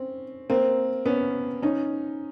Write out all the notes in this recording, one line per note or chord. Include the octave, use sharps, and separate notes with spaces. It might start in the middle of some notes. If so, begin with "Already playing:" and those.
Already playing: C4 C#4
A#3 C4
B3 C#4
C#4 D#4